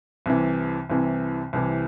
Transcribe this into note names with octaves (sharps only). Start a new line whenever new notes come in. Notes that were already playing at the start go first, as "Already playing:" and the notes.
C2 C3 E3
C2 C3 E3
C2 C3 E3